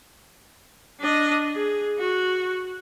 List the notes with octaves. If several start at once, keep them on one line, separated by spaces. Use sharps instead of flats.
D4 D#5
G#4
F#4